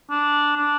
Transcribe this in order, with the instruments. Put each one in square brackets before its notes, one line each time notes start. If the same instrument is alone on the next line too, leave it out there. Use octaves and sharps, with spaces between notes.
[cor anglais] D4
D4